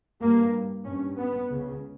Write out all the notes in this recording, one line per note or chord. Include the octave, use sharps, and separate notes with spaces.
G2 A#3
G2 C#4
B3
C#2 C#3